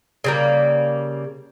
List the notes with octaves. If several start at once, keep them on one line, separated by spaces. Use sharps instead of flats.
C#3 G3 A#3